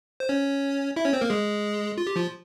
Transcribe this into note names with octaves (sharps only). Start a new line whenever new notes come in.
C5
C#4 C#5
E4 E5
C#4 C#5
C4 C5
A#3 A#4
G#3 G#4
F4
G4
F3 F4